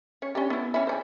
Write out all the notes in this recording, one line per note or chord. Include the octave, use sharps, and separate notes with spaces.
C#4 C#5
C#4 D4 G4
B3 E4
E3 C#4 E4
C5 D5 G#5